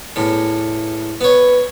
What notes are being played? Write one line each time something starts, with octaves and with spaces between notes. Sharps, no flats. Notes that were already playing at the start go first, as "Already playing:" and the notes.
E2 A2
B3 B4 C#5